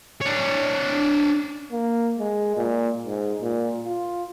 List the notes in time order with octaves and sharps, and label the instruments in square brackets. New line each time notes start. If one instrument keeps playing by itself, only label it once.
[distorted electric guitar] D4 C#5
[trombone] A#3
G#3
A#2
G#2
A#2
F4